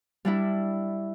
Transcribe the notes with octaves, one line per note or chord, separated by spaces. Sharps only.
G3 D4 E4